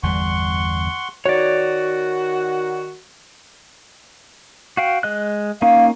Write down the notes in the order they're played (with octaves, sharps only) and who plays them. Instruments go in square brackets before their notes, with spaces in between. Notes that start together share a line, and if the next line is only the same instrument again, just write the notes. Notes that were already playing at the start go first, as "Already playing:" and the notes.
[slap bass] G1 E2 G3 [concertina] F#5 C6 C#6
[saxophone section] D#3 F#4 [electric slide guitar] C#5 D5
[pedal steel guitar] F#4 F5 G5
G#3 D#5 F#6
[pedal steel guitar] A#3 C#4 D#4 [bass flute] F5